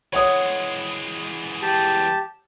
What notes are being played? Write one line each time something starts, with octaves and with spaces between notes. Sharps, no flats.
E3 G#3 C#5 F#5 D#6
G4 A5